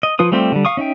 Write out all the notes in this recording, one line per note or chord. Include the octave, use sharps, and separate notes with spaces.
D#5
F3 F4 B4 D#6
G3 A3 C4 F4 G4
D3 G3
F5 C#6 D#6
C#4 D#4 E5 G5